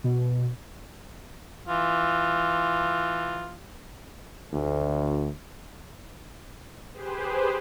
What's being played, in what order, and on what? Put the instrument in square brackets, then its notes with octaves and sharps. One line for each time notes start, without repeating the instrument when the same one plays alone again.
[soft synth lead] B2
[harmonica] E3 F4
[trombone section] D2
[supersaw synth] G4 G#4 B4 C5